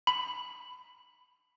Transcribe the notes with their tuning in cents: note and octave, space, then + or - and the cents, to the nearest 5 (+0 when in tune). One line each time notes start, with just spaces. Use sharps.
B5 +10